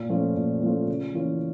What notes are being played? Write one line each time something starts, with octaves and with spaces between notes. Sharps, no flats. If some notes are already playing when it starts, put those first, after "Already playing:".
Already playing: A#2
F3 A3 C#4 F4
A#2
F3 A3 C#4 F4
C#3
E3 A#3 C#4 F4